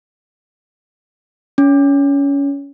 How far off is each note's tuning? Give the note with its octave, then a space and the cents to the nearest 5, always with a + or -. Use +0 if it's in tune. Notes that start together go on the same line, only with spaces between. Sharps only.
C#4 +20